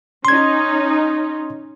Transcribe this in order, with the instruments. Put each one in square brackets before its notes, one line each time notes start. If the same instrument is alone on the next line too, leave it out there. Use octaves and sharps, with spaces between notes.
[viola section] C#4 D#4 [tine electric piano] C6 G#6